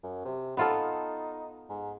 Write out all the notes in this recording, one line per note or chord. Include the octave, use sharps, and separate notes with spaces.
F#2
C3
B3 D#4 F4 A4
G#2